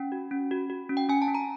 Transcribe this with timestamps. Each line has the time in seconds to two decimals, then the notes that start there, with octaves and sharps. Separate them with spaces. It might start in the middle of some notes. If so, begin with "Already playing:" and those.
Already playing: C#4 G5
0.12 F#4
0.31 C#4
0.51 F#4
0.70 F#4
0.90 C#4
0.97 G5
1.09 C#4 G#5
1.22 A5
1.28 C#4
1.35 A#5